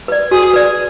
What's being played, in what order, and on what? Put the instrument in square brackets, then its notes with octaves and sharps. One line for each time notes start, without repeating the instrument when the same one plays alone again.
[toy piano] B4 D5
[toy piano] F#4 [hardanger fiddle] G#4
[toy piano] B4 D5